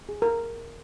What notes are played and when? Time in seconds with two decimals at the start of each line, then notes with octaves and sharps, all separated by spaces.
0.09 G#4
0.22 A#4